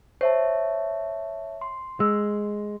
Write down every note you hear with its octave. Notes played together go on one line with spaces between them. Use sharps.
C5 C#5 E5 A5
C6
G#3 E6